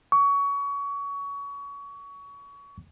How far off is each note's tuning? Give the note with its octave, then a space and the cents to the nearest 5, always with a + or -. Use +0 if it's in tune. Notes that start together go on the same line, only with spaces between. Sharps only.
C#6 +25